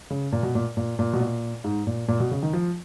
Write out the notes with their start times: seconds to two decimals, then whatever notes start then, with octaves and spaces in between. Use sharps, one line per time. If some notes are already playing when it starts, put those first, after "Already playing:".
0.10 C#3
0.32 A#2
0.43 B2
0.55 A#2
0.77 A#2
0.99 A#2
1.13 B2
1.20 A#2
1.64 G#2
1.87 A#2
2.08 A#2
2.20 B2
2.31 C#3
2.43 D#3
2.53 F3